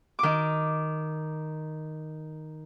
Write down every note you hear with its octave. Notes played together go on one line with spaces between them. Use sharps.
D#3 D6